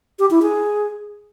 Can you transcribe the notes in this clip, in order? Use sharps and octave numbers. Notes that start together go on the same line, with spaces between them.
G4
E4
G#4